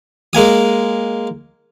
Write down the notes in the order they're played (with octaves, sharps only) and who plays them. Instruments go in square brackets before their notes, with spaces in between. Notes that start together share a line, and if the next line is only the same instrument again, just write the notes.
[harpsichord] G#3 A#3 G#5 D#6